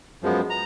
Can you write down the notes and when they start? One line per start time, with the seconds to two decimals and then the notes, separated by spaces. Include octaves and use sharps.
0.23 F#2 F3 G#3 B3
0.50 A#5